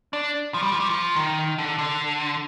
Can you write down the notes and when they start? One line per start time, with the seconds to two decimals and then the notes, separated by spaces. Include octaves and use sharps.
0.13 D4
0.54 F3
0.63 G3
0.72 F3
0.80 G3
0.89 F3
1.16 D#3
1.58 D3
1.78 D3